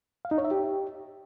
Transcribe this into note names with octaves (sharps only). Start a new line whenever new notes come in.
F5
D#4
C#5
E5
G4